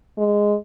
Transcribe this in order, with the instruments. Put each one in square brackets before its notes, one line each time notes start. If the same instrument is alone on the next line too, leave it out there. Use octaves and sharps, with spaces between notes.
[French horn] G#3